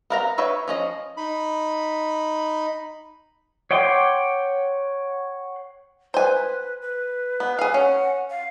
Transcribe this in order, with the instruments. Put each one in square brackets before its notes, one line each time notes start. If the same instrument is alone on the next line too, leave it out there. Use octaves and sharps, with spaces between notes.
[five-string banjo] B3 A#4 F5 A5 A#5
B4 C#5 E5 F5 G5
F3 C#4 D#5
[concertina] D#4 B5
[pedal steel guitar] C#5 F#5 G5 C6 D6
[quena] B4 [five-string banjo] C5 G#5
[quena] B4
[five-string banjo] B3
G#4 F5
[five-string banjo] C#4 [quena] F#5
[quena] F5